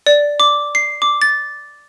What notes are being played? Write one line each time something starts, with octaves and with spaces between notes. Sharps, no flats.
D5
D6
C7
D6
A6